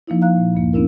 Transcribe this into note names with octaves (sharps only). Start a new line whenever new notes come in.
F3 A#3 D#4 E4
F5 A#5 F#6
A#2
D2 G2 A#3
B3 C#4 D4 E4 A#4